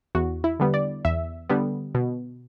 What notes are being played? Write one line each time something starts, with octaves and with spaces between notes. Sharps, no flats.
E2 F#4
E4
D3 G3 B3
D5
E2 E5
D3 G3 B3
B2